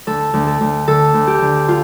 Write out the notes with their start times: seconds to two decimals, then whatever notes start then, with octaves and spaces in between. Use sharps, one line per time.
0.07 D2 A4
0.34 D2
0.47 A4
0.61 D2
0.87 D3 A4
1.14 D2
1.27 G4
1.41 D3
1.68 F4